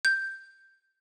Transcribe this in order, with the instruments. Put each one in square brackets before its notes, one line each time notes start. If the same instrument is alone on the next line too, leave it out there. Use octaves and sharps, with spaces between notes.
[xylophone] G6